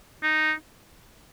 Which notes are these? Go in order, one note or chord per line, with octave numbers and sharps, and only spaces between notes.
D#4